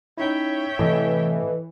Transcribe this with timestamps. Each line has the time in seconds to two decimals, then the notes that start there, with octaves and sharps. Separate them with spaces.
0.18 C#4 D#4 E4 C#5 E5 G5
0.79 A2 C3 E3 A4 D#5